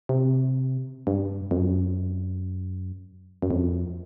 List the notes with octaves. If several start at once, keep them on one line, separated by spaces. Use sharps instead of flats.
C3
G2
F2
F#2
F#2
F2